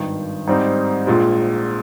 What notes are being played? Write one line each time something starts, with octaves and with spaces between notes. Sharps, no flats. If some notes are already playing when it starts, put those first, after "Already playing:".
Already playing: G#1 G2 D#3
G#2 G3 C4 D#4
A#1 A#2 G#3